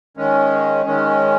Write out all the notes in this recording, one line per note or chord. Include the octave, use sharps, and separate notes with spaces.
D#3 G#3 C#4
D#3 G#3 C#4